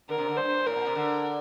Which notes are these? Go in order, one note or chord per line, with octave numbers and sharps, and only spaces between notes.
D3 A#4
C3
D3
G2 C5
A2 A#4
A#2
C3
D3